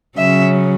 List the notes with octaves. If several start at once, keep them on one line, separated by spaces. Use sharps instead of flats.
C#3 F#3 C#4 E5